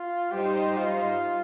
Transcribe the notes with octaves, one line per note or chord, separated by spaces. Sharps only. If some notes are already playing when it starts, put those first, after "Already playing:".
Already playing: F4
G3 D#4 G4 C5
F4